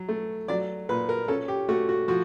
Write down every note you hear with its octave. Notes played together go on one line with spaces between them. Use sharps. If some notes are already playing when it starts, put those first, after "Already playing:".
Already playing: F#3
A3
F#3 D5
A#2 B4
A#4
C#4 A4
G4
A3 F#4
F#4
F3 F#4